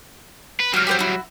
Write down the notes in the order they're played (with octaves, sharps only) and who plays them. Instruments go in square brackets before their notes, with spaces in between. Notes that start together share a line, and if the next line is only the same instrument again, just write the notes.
[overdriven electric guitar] B4
[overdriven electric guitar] F#3 G3 [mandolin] F#4 F6
[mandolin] G4 B4 C5
E4 F#4